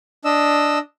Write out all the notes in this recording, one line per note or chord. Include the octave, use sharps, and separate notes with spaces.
D4 D#5 E6